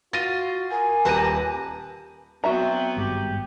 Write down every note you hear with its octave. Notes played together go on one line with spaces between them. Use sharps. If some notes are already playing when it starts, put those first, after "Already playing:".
F4 F#4 A6 A#6 D#7
A#4 G#5
D#1 G4 B4 A5 A#5 D#7
F#3 B3 C4 F#4 E5 A#5
G#1 G2 G#3 G4